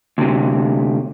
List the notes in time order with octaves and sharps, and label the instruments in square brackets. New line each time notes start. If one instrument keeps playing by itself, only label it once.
[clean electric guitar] D2 C3